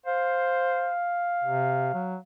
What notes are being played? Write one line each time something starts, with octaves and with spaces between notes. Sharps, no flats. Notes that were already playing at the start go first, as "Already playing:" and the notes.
C5 F5
C3
F#3